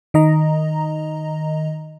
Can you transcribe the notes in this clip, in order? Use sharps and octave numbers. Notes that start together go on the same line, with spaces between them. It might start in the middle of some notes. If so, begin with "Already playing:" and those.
D#3 D#5 A#5